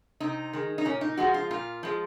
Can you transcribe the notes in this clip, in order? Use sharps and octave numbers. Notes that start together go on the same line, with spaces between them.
C3 D#4
D#3 G#3
D#4
A#2 C#4
D#4
F3 G#3 F#4
F4
A#2 F4
F3 G#3